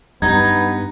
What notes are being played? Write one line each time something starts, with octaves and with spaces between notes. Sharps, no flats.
G2 B3 D#4 G#6